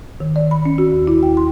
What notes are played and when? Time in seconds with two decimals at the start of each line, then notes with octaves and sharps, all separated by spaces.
0.20 D#3
0.36 D5
0.51 B5
0.65 C#4
0.78 F#4
0.92 D#2
1.07 E4
1.23 G5
1.37 C6